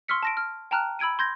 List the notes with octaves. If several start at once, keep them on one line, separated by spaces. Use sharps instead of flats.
C6 C#6 E6 F6 B6 C#7
A5 A#6 D7
F6
G5 A5 A#5 F6 F#6
B5 E6 G#6 D7 D#7
C6 G6 G#6 A#6